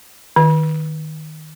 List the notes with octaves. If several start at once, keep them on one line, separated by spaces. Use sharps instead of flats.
D#3